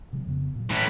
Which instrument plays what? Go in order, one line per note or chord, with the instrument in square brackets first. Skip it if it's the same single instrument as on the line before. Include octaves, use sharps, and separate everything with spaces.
[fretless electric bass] C3 F3 G#3
F2 C#3 B3
A#2 F#3
[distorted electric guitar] A2 E3